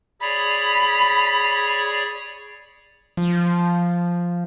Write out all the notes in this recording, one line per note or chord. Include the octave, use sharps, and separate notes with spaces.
G#4 C#5 D5 B5
F3